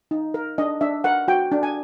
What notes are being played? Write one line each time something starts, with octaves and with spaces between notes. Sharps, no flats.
D#4
A#4
D4 D#5
D4 E5
A#4 F#5
F#4 G5
D4
G#5